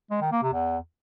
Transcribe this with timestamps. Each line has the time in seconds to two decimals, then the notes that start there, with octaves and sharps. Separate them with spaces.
0.11 G#3
0.21 D#3
0.32 A#3
0.43 C3
0.53 E2